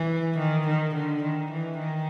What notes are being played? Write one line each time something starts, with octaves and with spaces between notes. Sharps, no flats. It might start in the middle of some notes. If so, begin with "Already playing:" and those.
Already playing: E3
D#3
D#3
D3
D#3
E3
D#3